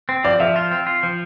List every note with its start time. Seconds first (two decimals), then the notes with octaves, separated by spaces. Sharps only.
0.09 C4
0.24 F3 D5
0.40 F3 E5
0.56 F4
0.72 C4
0.87 F4
1.03 F3